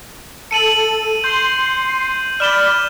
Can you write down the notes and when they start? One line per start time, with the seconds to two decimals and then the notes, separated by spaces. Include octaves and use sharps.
0.51 A4 C#7 D#7 F#7
1.24 C6 G6 C7
2.40 D5 B5 F6 E7 G7